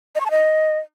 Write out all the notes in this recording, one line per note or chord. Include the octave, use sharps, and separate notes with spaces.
D#5
C#6
A5
D#5